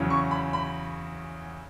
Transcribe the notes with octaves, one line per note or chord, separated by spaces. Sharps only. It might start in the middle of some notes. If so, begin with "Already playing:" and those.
Already playing: E2 C#3 F#3 C#4 E4
C#6
B5
B5